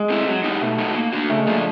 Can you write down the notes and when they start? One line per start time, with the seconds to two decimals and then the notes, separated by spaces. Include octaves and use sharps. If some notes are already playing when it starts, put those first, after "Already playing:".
Already playing: G#3
0.10 A3 C4 E4
0.28 F#3
0.44 B3 D#4 G4
0.61 B2 A3
0.78 G#3 B3 D#4 F#4
0.95 A#3
1.13 D4 F#4
1.30 C#3 A3
1.38 G#3
1.46 F3 A3 A#3 D4